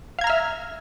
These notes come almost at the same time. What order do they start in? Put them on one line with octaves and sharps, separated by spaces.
F5 G#6 A#5 F6 E5